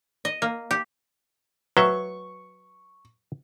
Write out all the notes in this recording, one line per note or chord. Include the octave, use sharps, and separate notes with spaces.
D#5
A#3
G4
F#3 B4 E5 C#6